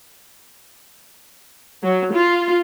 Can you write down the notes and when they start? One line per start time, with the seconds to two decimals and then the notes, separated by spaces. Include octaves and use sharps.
1.82 F#3
2.13 F4